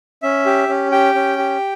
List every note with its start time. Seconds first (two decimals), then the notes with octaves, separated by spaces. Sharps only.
0.23 C#4 E5
0.46 G4
0.69 C#4
0.92 G4 G5
1.15 C#4
1.38 G4